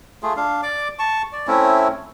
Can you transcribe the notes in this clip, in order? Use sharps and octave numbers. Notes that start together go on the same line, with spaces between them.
A3 F4 G#4
D4 F5
D5 D6
A5 C#6
D5
A3 C4 C#4 E4